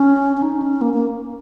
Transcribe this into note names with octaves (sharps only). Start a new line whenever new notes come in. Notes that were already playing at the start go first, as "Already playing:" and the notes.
Already playing: C#4
C#4
D#4
C#4
A#3
A#3